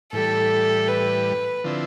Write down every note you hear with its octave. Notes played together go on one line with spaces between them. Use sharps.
A2 E3 G3 A4
B4
D3 F3 C4 E4